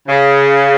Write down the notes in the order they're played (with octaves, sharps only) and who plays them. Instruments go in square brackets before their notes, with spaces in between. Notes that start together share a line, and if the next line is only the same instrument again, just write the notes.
[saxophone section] C#3